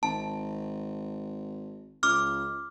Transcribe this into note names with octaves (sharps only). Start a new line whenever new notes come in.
G#1 A5
C#2 D6 F6